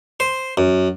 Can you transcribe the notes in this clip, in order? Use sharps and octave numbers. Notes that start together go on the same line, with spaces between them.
C5
F#2